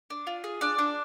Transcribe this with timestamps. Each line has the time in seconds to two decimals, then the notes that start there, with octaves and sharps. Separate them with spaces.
0.10 D4
0.27 F4
0.44 G#4
0.61 D4 D5
0.78 D4